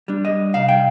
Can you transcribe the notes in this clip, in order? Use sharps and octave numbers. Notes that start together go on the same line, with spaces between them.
G3 D4
D#5
C3 F5
G5